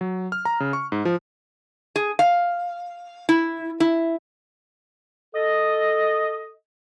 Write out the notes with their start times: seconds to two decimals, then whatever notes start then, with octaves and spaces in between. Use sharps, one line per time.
0.01 F#3
0.32 F6
0.45 A#5
0.60 C#3
0.73 C#6
0.92 G#2
1.05 F3
1.96 G#4
2.19 F5
3.29 E4
3.80 E4
5.35 A4 D#5